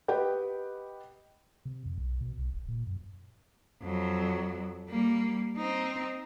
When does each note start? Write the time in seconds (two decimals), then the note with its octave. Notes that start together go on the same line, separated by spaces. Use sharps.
0.08 G4 B4 D#5 F#5 G5
1.65 C3
1.86 F2
1.98 B1
2.21 B2
2.38 B1
2.53 D#1
2.68 A#2
2.87 F#2
3.83 F2 F#3
4.89 G3 A#3
5.57 C4 D#4